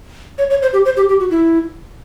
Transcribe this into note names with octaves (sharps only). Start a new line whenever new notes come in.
C#5
C#5
C5
G4
C5
G4
G4
F#4
E4